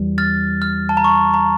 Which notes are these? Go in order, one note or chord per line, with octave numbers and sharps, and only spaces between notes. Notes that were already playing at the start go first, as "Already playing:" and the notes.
Already playing: E2 E3 G3
F6 A6
F6
A5
A#5
C#6
A#5